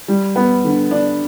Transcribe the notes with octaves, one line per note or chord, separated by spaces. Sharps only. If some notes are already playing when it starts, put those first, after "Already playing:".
G3
B3
D3
D4